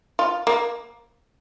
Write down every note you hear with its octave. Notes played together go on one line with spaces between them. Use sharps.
F4
A#3